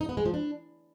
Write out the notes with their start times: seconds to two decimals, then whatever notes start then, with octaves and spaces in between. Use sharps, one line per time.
0.01 D#4
0.09 B3
0.17 G#3
0.25 F3
0.34 D4